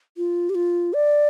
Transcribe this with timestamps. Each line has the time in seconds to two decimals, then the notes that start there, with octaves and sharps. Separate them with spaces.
0.17 F4
0.50 G4
0.55 F4
0.94 D5